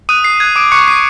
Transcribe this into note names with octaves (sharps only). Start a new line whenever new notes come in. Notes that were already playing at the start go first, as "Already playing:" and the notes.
D#6 F#6 D#7
D#6 C7
F#6 G#6
D6 D#6 D7
C#6 F#6 C#7
D#6 C7